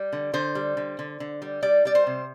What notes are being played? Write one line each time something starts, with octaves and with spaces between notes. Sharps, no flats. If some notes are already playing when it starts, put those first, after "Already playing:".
Already playing: G3
D3
D3 C5
G3
D3
D3
D3
G3
G3 D5
G3 D5
C5
C3